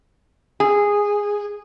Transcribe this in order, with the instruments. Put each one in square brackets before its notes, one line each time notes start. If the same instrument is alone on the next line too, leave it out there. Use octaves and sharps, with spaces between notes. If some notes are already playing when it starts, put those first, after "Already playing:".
[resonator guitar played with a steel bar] G#4